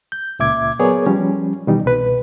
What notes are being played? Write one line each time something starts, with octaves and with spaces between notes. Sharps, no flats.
G6
C#2 A#2 E5 D6 G#6
F#3 B3 G#4 A#4 C#5 D5
F3 G3 C#4
B2 D#3 E3 G3 D#4
C2 B2 B4